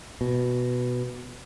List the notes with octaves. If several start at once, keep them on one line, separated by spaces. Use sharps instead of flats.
B2